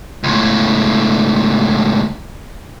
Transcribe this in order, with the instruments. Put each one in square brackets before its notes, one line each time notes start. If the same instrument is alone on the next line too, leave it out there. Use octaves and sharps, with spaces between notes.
[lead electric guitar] C#2 A2